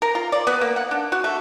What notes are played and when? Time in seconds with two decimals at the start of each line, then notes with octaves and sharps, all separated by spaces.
0.02 A#4
0.15 F4
0.32 D5
0.47 B3
0.61 A#3
0.76 F#5
0.91 D4
1.12 F#4
1.24 A3